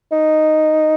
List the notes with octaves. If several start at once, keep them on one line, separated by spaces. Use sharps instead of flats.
D#4